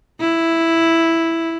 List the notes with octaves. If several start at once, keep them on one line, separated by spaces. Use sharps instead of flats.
E4